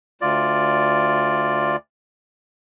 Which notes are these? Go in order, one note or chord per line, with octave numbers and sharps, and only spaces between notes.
D2 F4 D5